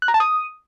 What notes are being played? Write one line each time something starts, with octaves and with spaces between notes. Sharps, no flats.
F#6
A#5
A5
D#6